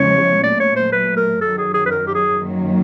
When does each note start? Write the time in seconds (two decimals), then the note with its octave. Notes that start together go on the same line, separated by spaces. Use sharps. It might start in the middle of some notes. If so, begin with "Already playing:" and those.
Already playing: E2 C#3 F3 G#3 C#4 C#5
0.43 A#2 F#3 A3 D5
0.60 C#5
0.76 C5
0.92 B4
1.17 A#4
1.41 F#2 D#3 F#3 A4
1.58 G#4
1.74 G#4
1.86 B4
1.91 A#4
2.07 G4
2.15 G#4
2.39 F#2 D#3 F#3 A#3